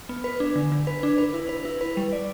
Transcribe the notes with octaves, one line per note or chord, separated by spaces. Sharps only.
B3
B4
D4
D3
D3
B4
D4
B4
E4
B4
E4
B4
G3
D5